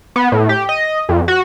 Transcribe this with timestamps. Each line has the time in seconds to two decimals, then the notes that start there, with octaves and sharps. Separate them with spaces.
0.16 B3
0.32 A2
0.49 G4
0.69 D#5
1.09 F2
1.28 F#4